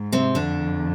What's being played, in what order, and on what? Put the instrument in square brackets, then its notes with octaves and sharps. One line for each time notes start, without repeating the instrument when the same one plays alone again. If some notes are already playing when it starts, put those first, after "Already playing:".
Already playing: [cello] G#2
[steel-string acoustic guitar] C3 C4
[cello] F2 [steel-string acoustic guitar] D3 D4